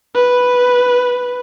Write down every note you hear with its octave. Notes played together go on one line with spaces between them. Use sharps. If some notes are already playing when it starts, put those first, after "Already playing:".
B4